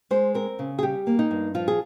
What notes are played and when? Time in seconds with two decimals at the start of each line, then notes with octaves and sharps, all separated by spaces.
0.11 G#3 C5
0.34 C4 A#4
0.59 C#3
0.79 G#4
0.83 G3 G4
1.07 A#3
1.19 D#4
1.31 G2
1.55 F3 F4
1.68 G#4